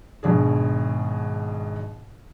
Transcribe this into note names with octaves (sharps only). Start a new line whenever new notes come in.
G#1 B2 D4 G#4